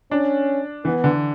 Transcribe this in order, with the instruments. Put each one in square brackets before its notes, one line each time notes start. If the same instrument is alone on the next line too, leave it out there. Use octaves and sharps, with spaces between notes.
[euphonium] C#4 [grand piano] D4
[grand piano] E3 [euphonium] B3
[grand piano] D3